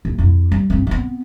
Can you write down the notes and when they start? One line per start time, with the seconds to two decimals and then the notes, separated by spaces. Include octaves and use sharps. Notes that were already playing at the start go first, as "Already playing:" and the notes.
0.05 D#2
0.18 F2 E4
0.52 G3
0.70 G2 C4
0.87 B3 C4